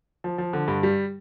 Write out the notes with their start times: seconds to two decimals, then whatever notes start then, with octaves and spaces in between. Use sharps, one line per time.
0.24 F3
0.38 F3
0.53 D3
0.68 G2
0.83 G3